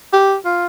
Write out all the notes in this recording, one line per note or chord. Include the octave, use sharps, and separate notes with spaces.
G4
F4